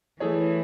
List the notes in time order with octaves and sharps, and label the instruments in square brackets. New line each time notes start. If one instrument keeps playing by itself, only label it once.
[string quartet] E3 [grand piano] A3 E4 G#4 C#5